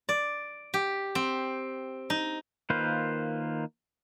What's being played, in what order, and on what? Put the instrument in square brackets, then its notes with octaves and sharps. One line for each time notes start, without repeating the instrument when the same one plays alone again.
[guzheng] D5
G4
C4
D#4
[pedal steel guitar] D#3 A#3 F4 B4 C5